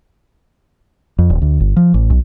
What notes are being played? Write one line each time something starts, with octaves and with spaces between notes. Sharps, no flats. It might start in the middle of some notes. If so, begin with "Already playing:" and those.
F2
D#1
D2
G1
F3
A1
B1